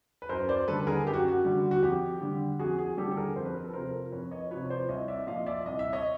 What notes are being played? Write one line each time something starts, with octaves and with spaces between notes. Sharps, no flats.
B4
F#2 A#4 C5
C5 D5
D3 G3 A4 B4
B4
G#4 A#4
F#2 G4
F#4
F#4
D3 G3
F#4
F2 G4
D3 G3
F2 F#4 G#4
F#4 G#4
D3 G3 G4 A4
A4
G#4 A#4
F2 C5
B4
A#4
A4 B4
C3 F3 A#4 C5
F2 B4 C#5
C#5 D#5
C3 F3 B4 C#5
C5 D5
C2 C#5 D#5
D5 E5
A#2 F3 D#5 F5
D5 E5
C2 D#5
E5
C#5 D#5